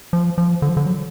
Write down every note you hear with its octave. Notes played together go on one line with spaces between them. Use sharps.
F3
F3
D3
F3
D3
F#3